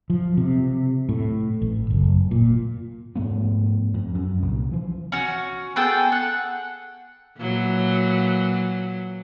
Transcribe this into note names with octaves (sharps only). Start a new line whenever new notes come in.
F3
C3
A2
A1
F#1
A#2
G#2 F3 A3 B3
F2
F#2
C2 A#2
E3 F3
C#4 F#4
B3 G#4 A4 G5
F#5
A#2 E3 F#3